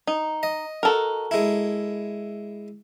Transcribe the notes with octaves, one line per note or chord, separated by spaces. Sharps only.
D#4
D#5
F#4 A4 A#4
G#3 E4